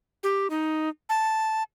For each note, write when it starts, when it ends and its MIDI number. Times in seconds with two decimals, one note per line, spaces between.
0.23 0.47 67
0.50 0.89 63
1.09 1.63 81